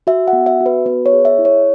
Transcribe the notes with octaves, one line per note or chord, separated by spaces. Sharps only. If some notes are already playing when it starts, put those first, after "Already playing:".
F#4 E5
F#5
B3
E5
F#4
B4
B3 B4
C#5
G#4
E5
E4
C#5